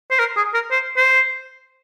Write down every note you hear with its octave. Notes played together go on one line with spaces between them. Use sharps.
C5
A#4
G#4
A#4
C5
C5